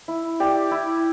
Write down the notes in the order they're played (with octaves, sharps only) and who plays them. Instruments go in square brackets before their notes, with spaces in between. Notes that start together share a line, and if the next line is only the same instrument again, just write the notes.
[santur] E4
G4 D5
E4